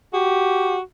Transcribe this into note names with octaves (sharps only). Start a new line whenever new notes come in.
F#4 G4